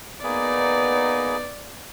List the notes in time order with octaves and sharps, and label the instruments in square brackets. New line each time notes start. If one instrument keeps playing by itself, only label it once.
[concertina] A#3 G#4 B4 [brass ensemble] B3 D#4 [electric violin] D5